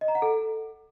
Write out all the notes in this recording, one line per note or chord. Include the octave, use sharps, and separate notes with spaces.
D#5
A#5
F#5
A4